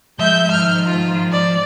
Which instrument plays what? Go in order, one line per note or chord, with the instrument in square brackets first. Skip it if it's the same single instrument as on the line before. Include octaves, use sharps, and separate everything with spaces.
[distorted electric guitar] F3 C6 [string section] G#3 G6 [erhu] E5
[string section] G#2 D#3 [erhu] F6
[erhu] F4
D5